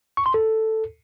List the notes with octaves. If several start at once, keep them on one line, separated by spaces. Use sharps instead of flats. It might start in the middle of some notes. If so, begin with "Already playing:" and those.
C#6
C6
A4